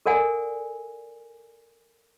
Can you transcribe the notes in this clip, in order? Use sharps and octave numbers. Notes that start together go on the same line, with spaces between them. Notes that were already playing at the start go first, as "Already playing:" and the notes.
A4 A#4 D5 F#5 G#5